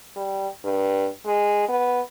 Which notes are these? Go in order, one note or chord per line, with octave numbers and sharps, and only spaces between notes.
G3
G2
G#3
B3